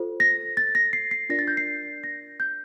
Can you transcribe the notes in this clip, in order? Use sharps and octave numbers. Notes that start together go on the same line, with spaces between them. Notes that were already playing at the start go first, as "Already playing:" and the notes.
Already playing: F4 A4 C5
A#6
A6
A#6
C7
C7
D4 F4 A#4 D5 A#6
A6
G6
C7
A#6
G6